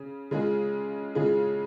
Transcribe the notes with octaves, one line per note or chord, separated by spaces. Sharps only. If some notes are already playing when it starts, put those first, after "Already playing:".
Already playing: C#3
C#3 G#3 F4 G#4
C#3 G#3 F4 G#4